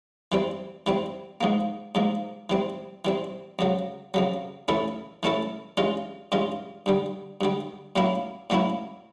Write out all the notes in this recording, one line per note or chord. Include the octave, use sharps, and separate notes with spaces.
E3 G3 C4
E3 G3 C4
G#2 F3 A#3
G#2 F3 A#3
E3 G3 C4
E3 G3 C4
F2 C#3 F#3
F2 C#3 F#3
E3 A3 C#4 E4 A4
E3 A3 C#4 E4 A4
G2 E3 G#3 C#4 F4
G2 E3 G#3 C#4 F4
G2 D3 G3
G2 D3 G3
A2 F#3 A#3 C#4 E4
A2 F#3 A#3 C#4 E4